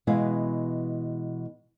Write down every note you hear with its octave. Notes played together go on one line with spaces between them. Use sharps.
B2 E3 G#3 B3 E4 F5